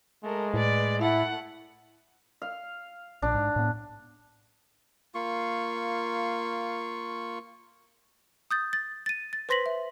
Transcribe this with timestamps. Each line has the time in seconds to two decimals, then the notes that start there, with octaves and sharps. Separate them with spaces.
0.24 G#3 A3 A#4
0.54 A2 B4 D5
1.00 A3 E4 F#5
2.42 F5
3.22 A#1 A#2 D4
3.34 G#2
3.56 A2 B3
5.15 A#3 F4 C#6
8.51 D#6 G6 A6
8.73 A6
9.06 A6 D#7
9.33 A6
9.49 B4 C5 C6 A#6 B6 F#7
9.66 E5